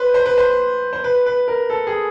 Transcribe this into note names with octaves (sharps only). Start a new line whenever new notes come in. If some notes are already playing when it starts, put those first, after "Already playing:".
Already playing: B4 C5
C5
B4
C5
C5
B4
B4
A#4
A4
G#4